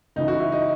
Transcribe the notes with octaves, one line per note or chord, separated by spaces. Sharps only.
C#2 C#3 E3 D#4
F#4
E4
D#4